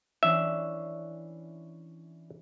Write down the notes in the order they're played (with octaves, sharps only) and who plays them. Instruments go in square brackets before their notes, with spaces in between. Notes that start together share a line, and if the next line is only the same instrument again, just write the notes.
[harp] E3 C#4 D4 [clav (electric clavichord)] E5